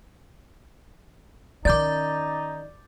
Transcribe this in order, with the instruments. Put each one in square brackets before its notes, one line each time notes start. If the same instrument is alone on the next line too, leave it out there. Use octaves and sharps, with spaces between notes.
[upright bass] D#3 C#4 [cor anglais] D#4 [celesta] D5 [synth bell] D6 G6 A6